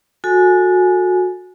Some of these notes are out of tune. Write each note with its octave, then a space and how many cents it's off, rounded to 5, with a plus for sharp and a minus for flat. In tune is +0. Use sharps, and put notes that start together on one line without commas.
F#4 -25 A4 +5 G#5 +15